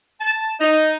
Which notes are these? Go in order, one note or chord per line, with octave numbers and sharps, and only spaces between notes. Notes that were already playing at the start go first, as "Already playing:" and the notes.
A5
D#4